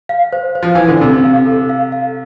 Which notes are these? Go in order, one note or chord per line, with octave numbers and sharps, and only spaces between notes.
F5
C5
C5
F3
E3 C5
D3
C3 A4
F5
A4
F5
F5